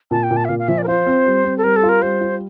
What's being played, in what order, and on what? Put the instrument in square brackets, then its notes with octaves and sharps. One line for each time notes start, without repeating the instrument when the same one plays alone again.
[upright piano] A#2 [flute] A5
[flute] G5
[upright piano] A#2
[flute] A5
E5
[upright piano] A#2 [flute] F5
[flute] F5
[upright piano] F3 [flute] E5
[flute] D5
A#4
[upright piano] F4 [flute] C5
[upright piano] C4
G3
C4
[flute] A4
[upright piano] G3 [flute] A#4
[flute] A4
[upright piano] F4
[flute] A#4
[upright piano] G3 [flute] C5
[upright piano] F4